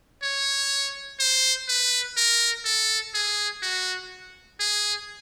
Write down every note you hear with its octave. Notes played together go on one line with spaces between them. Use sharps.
C#5
C5
B4
A#4
A4
G#4
F#4
G#4